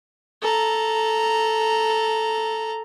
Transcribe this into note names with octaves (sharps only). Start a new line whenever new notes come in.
A4 A#5